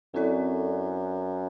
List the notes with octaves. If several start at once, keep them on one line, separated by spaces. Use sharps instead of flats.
F#2 C4 E4 A4 D5